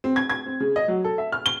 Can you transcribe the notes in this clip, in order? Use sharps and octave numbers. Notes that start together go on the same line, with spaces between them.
C4
G#6
G#6
C4
C#3
D#5
F#3
A4
E5
F6
G7